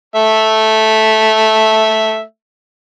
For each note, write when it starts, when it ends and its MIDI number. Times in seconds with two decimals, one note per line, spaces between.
0.16 2.22 57
0.16 2.22 76